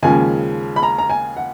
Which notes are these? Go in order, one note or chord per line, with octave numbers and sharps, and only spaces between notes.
D#2 C#3 F3 G#3 G#5
B5
A#5
A#5
G#5
F#5